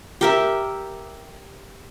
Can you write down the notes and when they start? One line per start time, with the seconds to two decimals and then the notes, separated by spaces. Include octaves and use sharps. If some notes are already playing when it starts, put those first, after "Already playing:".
0.21 G4 A#4 E5